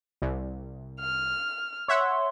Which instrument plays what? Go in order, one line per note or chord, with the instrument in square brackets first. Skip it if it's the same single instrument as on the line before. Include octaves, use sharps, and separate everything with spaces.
[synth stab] C2
[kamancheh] F6
[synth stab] C#5 E5 F#5 [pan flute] C6